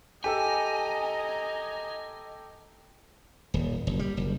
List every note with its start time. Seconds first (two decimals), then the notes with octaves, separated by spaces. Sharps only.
0.24 G4 A4 D#5 G#5 A#5 E6
3.54 D#1
3.87 F#1
3.99 G3
4.17 F#1